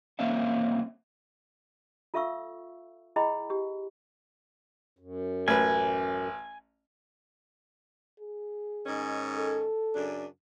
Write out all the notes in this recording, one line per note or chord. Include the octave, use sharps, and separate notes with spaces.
B1 A#3 C4 C#4 E5 F5
F4 A4 E5 F5 C#6 E6
E4 G#4 D#5 G5 B5
G4
F#2
A1 B4 G#5
G#4
G#2 D#3 C#4
A4
F#2 C#3 D4